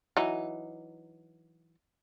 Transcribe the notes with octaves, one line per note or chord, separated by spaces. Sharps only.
E3 F#3 D#4